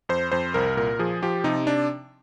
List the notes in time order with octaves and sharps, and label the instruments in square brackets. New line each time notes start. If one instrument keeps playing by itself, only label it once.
[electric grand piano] F2 C5
F2 C5
C2 A#4
A#2 A#4
F3 G#4
F3 G4
C3 D#4
D4